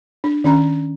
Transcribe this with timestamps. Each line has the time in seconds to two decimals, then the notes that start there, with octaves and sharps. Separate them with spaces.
0.24 D4
0.44 D#3 C#4 A#5